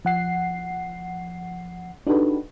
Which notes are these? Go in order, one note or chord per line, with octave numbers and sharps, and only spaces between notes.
F3 F#5 C7
D4 D#4 F#4 G4 A4 B4